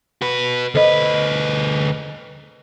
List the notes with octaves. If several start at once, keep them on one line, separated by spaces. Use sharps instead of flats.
F#4 B4
D2 A4 B4 C5 D#5